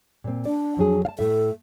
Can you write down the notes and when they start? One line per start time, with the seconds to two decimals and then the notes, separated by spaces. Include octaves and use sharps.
0.24 A#2 C4
0.45 D4 D5
0.77 F2 F#3 G#4
1.05 F5 A5
1.19 A2 A4 E5